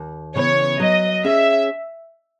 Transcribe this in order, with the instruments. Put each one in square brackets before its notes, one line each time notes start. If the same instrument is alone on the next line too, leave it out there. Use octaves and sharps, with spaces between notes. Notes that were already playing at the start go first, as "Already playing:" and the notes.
Already playing: [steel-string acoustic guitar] D#2
[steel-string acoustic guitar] C#3 E3 B3 [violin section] C#5
[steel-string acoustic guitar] F#3 [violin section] D#5
[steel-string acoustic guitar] C#4 G#4 C#5 [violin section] E5